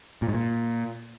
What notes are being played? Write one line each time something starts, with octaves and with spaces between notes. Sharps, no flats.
A#2
G#2
A#2